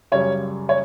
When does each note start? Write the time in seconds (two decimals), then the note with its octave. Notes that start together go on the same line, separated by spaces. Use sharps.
0.12 F#2 C#3 G3 C#5
0.69 C#5